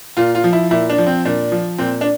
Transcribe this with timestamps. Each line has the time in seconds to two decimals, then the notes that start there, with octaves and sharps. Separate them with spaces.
0.17 A#2 F4
0.35 F4
0.44 F3
0.53 E4
0.71 A#2 E4
0.89 D4
0.98 F3
1.07 C4
1.25 A#2 D4
1.52 F3
1.78 A#2 C4
2.01 D4